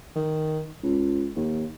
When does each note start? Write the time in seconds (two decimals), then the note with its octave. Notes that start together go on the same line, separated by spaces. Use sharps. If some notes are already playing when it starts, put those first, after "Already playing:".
0.16 D#3
0.83 C#2
1.36 D#2